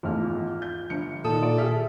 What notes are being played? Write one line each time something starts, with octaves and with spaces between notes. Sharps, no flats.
G#1 E2 A3 F4 F6
G6
G1 G2 C#7
A#2 D#3 A4 D#6
D5
G4 G#4 E5 F6